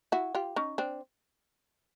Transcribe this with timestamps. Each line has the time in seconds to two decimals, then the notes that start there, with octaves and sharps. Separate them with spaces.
0.12 E4 F#4
0.35 F4 G4
0.56 C#4 D#4
0.78 C4 D4